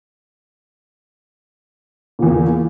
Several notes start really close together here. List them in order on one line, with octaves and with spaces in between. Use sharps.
A#2 E2 A#3